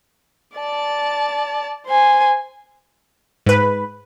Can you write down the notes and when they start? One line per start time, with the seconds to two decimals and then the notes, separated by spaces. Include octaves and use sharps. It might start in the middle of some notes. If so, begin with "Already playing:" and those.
0.57 D5 A5
1.87 C5 G#5
3.46 G#2 B4